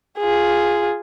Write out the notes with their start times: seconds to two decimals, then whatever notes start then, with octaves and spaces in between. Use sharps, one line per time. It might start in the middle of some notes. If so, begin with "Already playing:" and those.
0.20 F4 G#4